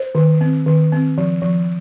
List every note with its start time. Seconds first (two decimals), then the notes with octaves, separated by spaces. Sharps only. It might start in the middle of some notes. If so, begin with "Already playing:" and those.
Already playing: C5
0.15 D#3
0.41 C4
0.66 D#3
0.92 C4
1.18 F3
1.42 F3